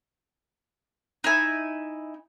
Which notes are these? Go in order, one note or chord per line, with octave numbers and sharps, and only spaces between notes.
D#4 E4 G#5